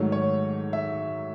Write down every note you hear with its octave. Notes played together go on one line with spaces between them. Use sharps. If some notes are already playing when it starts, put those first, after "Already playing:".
Already playing: G#2 D#3 F#3 A3 C#5
C#5
E5